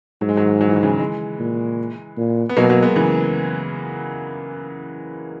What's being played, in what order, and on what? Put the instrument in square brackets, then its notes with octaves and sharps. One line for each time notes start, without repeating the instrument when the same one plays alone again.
[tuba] G#2 [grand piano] F#3
[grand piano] G#3
D#3 F#3
F#3
E3
D#3
C#3 E3
E3 G#3
[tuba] A#2
A#2
[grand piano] B3
[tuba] B2 [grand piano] F#3 A#3
[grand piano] F#3 A#3
G#3 B3
C#3 E3